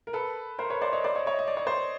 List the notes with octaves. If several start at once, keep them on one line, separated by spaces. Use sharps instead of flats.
A#4
A4 B4
A#4 C5
B4 C#5
C5 D5
C#5 D#5
C5 D5
C#5 D#5
C#5 D#5
D#5
D5
C#5
C5 D5